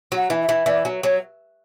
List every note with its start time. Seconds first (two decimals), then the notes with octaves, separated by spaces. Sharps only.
0.12 F#3
0.17 F#5
0.30 E3
0.42 E5
0.49 E3
0.66 E3 D5
0.85 F#3
1.03 F#3 C#5